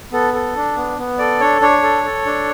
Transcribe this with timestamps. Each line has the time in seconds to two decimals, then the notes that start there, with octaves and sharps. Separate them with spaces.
0.12 B3 A4
0.34 A4
0.56 D4
0.77 B3
0.98 B3
1.19 A4 D5
1.40 D4 C#5
1.61 D4 C#5
1.83 A4
2.05 A4
2.26 D4